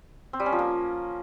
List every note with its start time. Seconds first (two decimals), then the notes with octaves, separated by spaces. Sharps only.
0.33 C4
0.40 G3
0.46 C#4
0.52 F3
0.59 A#3